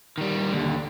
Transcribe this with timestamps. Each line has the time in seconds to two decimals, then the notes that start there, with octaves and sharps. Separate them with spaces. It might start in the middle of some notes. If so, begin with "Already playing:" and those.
0.18 D#3 G3
0.52 D#2 D3